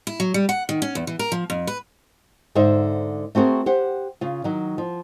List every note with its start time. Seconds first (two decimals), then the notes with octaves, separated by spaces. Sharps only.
0.07 E4
0.20 F#3
0.34 G3
0.49 F#5
0.69 D#3
0.82 C#4
0.95 E2
1.07 E3
1.19 A#4
1.32 F3
1.50 F2
1.67 B4
2.55 G#2 D3 D#4 C5 E5
3.35 A3 C4 F#4 G#4 A#4
3.66 G4 C5 F#5
4.21 C#3 F4
4.44 D#3 F#3
4.78 F3